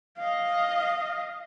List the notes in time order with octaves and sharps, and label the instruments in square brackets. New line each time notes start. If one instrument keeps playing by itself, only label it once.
[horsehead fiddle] D#5 F5